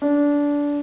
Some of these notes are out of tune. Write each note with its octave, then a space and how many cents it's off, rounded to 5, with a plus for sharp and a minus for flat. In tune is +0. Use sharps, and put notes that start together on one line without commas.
D4 -20